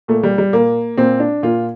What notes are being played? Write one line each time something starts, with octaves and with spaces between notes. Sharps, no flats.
A#2 A3
G3
G3
A#2 A#3
A#2 C4
D4
A#2 F4